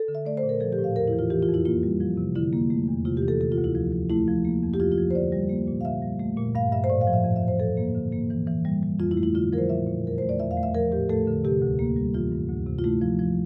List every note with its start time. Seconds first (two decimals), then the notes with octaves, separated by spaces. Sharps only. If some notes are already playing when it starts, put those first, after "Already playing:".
Already playing: A4
0.08 D3
0.15 E5
0.25 A3 D5
0.37 C5
0.43 A#2
0.49 A#4
0.61 F3 A4
0.73 G4
0.78 A2
0.84 F5
0.95 E2 A#4
1.08 E4
1.13 E3
1.19 F4
1.30 E3 G4
1.43 F4
1.48 F2
1.54 E4
1.65 A#3 F4
1.83 G3
2.01 F3
2.17 C3
2.36 D3 E4
2.53 A#3
2.70 A3
2.88 E2
3.05 C3 F4
3.17 G4
3.23 E3
3.28 A4
3.41 C3 A4
3.52 F4
3.58 D2
3.64 E4
3.75 F3
3.92 F3
4.10 A3 E4
4.28 F3
4.45 A#3
4.63 F2
4.74 G4
4.80 F3 F4
4.92 F4
4.98 F3
5.10 C5
5.15 D3 D5
5.32 G3
5.50 A#3
5.68 A#2
5.81 F5
5.85 D3 E5
6.02 G3
6.20 A3
6.37 A#2
6.55 G2 F5
6.72 G2 E5
6.84 C5
6.90 A2 D5
7.01 F5
7.07 F3
7.13 E5
7.25 F2
7.36 E5
7.42 E3
7.48 C5
7.60 F3 A4
7.77 A#3
7.95 D3
8.13 A#3
8.30 E3
8.47 E3
8.65 G3
8.83 G3
9.00 F2 F4
9.11 E4
9.17 A3
9.23 E4
9.35 D3 F4
9.53 F3 A#4
9.58 C5
9.69 A#2 E5
9.87 A#2
10.04 E2 A#4
10.18 A3 C5
10.29 D5
10.40 E2 E5
10.51 F5
10.57 A3
10.63 E5
10.74 F3 A#4
10.92 A2 G4
11.09 A3 A4
11.27 D3
11.44 C3 G4
11.62 D2
11.79 A#3
11.96 G3
12.14 E3 F4
12.32 G2
12.50 D2
12.67 C3
12.79 F4
12.84 A3 E4
13.02 F3
13.19 F3